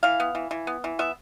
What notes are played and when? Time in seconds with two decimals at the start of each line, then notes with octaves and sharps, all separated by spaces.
0.03 E3 F5
0.20 B3
0.35 E3
0.51 E3
0.67 B3
0.84 E3
0.99 B3 E5